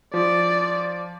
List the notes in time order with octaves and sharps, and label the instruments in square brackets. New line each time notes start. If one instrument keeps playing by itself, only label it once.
[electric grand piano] F3 [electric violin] D5